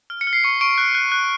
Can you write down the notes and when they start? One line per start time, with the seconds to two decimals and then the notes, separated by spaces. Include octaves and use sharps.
0.10 F6
0.21 C#7
0.27 F6
0.33 C7
0.44 C#6 C#7
0.61 C#6 D7
0.78 F#6
0.95 F#6
1.12 F#6